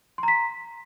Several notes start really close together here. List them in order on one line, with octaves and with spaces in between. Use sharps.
C6 A#5 B6